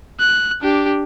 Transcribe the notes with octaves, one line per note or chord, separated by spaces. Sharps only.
F#6
D4 G4